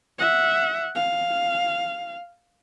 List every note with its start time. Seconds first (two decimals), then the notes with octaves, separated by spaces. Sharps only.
0.18 E5 F#5
0.95 F5